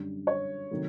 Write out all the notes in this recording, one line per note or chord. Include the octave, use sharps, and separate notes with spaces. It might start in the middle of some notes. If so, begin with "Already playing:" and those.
Already playing: F#2 D3 G3
C#5
C3 D#3 F#3 A3